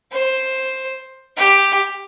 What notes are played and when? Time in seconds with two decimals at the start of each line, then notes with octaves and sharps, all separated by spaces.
0.12 C5
1.37 G4